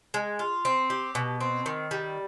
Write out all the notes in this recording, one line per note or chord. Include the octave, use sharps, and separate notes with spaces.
G#3
F4
C4
G4
B2
C4
D#3
G3